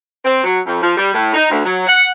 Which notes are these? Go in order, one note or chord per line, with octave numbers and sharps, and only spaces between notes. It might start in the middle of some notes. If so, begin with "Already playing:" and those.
C4
F#3
F2
F3
G3
A2
D#4
D2
F#3
F#5